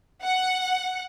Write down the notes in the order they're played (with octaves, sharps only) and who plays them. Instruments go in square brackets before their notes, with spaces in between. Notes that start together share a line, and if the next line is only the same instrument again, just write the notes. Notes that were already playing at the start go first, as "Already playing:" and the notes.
[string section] F#5